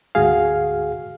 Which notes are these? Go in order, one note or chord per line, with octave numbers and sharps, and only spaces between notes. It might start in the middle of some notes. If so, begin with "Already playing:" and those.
D2 G#2 F#4 G#4 F5